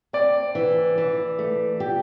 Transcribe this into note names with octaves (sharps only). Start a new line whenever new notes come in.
C4 D5
E3
E3
A3
G4